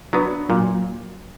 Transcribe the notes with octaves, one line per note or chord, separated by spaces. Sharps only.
F#3 B3 D4 F#4
A#2 F#3 A#3